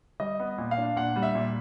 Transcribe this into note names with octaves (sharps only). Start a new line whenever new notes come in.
G3 D#5
B3
A#2
F5
D4
A#2 F#5
G3
E5
A#2